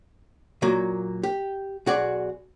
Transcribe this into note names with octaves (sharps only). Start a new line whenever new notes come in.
A#2 F#3 A#3
G4
B1 F#4 G#4 D5